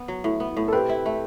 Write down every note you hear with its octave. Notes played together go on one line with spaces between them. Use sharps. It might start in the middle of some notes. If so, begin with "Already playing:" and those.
Already playing: B3
F#3
A2
B3
A2
A4
C4 G4 B4
E4
A3